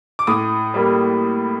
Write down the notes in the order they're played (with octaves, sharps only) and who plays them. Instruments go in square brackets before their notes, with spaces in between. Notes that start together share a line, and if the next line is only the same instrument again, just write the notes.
[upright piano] D6
A2 D#6
G3 A#3